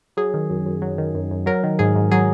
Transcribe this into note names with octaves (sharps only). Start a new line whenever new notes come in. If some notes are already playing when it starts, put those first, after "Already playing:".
F#3 G#4
D#3
F#2
F#2
F#3
D#3
F#2
F#2
F#3 A#4
D#3
G#2 G#4
G#2
F#3 G#4